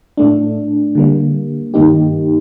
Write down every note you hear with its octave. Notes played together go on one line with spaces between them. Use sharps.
A2 A3 D4
D3 G3 A#3
G2 D#3 A#3 D#4 G4